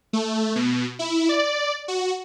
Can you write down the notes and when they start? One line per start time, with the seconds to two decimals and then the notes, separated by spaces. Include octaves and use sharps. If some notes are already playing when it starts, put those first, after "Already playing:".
0.13 A3
0.56 B2
0.99 E4
1.29 D5
1.88 F#4